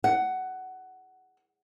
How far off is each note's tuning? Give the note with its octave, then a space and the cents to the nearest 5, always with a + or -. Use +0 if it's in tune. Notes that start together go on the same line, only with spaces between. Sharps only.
F#5 +15